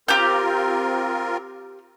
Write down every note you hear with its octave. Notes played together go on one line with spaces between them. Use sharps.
C4 F4 G4 A#4 G6